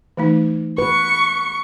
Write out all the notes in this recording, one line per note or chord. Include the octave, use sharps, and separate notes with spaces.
E3 A3 D#4
B4 C#6